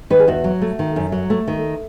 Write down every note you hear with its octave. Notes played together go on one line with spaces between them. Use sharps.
D#3 B4
G#4
E2 F#4
F#3
A3
D#3
F#2
F#3
A3
D#3